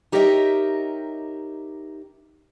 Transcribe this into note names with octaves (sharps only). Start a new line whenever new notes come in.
D#4 G4 A#4 C#5 D#5 E5